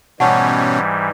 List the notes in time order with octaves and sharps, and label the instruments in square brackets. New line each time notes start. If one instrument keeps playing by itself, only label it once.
[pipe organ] G#2 E3 G3 [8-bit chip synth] B2 C#4 [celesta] F#5 A5 C#6